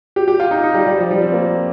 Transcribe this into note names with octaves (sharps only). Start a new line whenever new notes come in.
G4
G4
F4
D#4
D#4
G3
G3
F3
G3
C4
A#3